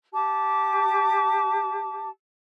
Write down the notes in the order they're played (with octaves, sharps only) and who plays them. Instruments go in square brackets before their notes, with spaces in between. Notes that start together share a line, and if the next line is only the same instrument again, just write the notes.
[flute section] G4 A5 D6